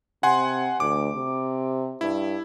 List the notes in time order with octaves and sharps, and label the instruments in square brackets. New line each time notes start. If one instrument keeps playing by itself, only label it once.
[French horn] C3 [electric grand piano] F#5 G#5 C6
[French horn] D2 [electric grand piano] D6
[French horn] C3
[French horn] G2 [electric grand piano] E4